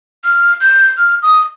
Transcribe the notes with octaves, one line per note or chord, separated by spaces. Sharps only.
F6
G6
F6
D#6